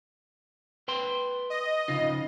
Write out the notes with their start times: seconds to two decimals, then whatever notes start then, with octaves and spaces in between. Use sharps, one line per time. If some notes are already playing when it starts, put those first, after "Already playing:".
0.88 B4 G5 C6
1.50 D#5
1.88 C#3 D#4 F4